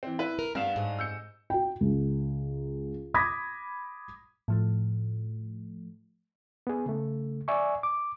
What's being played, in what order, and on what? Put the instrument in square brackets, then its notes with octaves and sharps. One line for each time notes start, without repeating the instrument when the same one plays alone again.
[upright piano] E3 C4
E4 B4
[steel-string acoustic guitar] A#4
[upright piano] G2 F5 E7 [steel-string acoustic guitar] B3
[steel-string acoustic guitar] G#2 D#5
[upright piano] E6 G6 C#7
[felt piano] F#4 G5
C#2
B5 D6 D#6 G#6 A#6 B6
[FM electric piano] A2 F3 A3
[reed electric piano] B3 G#4
C#3 A3
D5 E5 G#5 C#6
D6